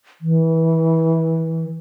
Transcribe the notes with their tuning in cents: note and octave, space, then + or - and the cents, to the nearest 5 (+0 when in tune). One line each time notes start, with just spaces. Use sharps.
E3 -20